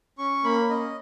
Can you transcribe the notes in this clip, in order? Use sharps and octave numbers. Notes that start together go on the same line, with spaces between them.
C#4 C#6
A#3 B5
C#4 D#5